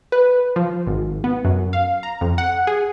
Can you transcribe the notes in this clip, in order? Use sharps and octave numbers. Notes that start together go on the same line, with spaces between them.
B4
F3
G#1
B3
F#2
F5
A#5
F2
F#5
G#4